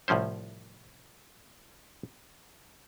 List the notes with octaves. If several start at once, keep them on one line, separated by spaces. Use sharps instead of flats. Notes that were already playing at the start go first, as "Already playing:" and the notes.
C2 A2 F3 C#4 C5